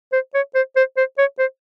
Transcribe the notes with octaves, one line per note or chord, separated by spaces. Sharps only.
C5
C#5
C5
C5
C5
C#5
C5